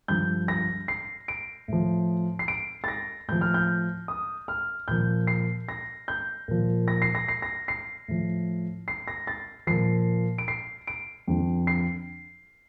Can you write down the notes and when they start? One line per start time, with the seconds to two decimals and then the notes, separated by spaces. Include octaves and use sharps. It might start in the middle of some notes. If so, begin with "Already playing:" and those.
0.08 G2 D3 F3 G6
0.48 A#6
0.88 C7
1.28 D7
1.68 A2 F3
2.39 C7
2.48 D7
2.84 A6
2.88 A#6
3.28 A2 F3 G6
3.41 F6
3.54 G6
4.08 D#6
4.48 F6
4.88 A#2 F3 G6
5.27 C7
5.69 A#6
6.08 G6
6.48 A#2 F3
6.88 A#6
7.02 C7
7.15 A#6
7.28 C7
7.42 A#6
7.68 C7
8.08 A2 F3
8.88 C7
9.08 A#6
9.27 A6
9.67 A#2 F3 C7
10.38 D7
10.48 C7
10.87 D7
11.28 F2 D3 F3
11.67 C7